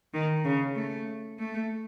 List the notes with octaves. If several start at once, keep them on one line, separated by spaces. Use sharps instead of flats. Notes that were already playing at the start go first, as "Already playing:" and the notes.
D#3
C#3
A3
A3